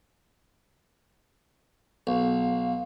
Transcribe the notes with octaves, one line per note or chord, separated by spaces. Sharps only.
B1 F5